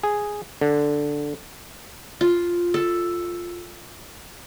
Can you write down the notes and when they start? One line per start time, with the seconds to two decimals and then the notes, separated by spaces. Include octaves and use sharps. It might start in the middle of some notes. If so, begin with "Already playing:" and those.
0.03 G#4
0.61 D3
2.21 F4
2.74 A4